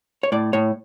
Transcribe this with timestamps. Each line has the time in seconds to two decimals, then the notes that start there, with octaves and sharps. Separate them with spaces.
0.23 C#5
0.32 A2 D5
0.53 A2 C#5